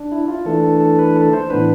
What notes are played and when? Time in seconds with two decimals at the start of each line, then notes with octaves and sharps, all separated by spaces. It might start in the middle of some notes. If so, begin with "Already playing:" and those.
Already playing: D4
0.12 E4
0.28 F4
0.45 E3 A3 D4 A4
0.64 A4
0.81 A4
0.99 B4
1.16 A4
1.33 C5
1.50 A2 E3 B3 D4 B4